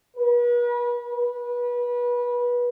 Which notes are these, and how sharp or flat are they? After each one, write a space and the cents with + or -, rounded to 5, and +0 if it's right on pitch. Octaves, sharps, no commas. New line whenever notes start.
B4 -40
B4 -25